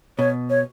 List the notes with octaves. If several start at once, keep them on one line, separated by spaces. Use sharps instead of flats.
B2 C#5
C#5